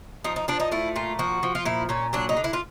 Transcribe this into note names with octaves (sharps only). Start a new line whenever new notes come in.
F3 D#4
D#4
F3 D4
D#4
A3 E4
A#2 F4
F3 F#4
F3
F4
A#2 E4
A#2 C#4
F#3 D4
D#4
D3
E4
F4